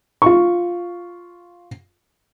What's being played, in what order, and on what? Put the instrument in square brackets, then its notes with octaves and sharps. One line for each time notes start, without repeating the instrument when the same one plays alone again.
[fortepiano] F4 C#6